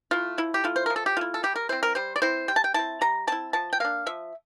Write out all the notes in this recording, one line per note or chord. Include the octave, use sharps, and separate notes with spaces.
A3 E4 F4
F3 E4
G4
A3 E4 F4
C5
F3 A#4
A4
G4
A3 E4 F4
A4
G3 G4
A#4
C4 E4 C5
A#4
G3 C5
D5
C4 E4 C5
G3 G5
A5
G5
C4 E4 A5
G3 A#5
C4 E4 A5
F3 A5
G5
A#3 D4 F5
F3 E5